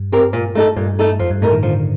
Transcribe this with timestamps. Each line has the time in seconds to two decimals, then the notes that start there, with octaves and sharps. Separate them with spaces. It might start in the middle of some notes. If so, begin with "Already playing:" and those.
Already playing: G2
0.12 C4 G4 A#4
0.33 A#2
0.55 A3 D#4 A4
0.76 G2 A#2
0.99 A3 D#4 A4
1.19 F2 F3
1.30 G2
1.42 A2 A3 D#4 A#4
1.52 D#3
1.63 D3 F3